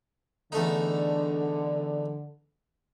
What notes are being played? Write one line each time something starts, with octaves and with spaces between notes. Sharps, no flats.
E2 D3 A3 D#4